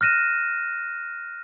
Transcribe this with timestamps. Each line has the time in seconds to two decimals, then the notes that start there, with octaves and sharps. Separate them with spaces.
0.01 F6 F#6 A#6 D#7 E7